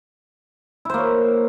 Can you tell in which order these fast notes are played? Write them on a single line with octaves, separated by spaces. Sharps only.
E4 C5 A#3 C#5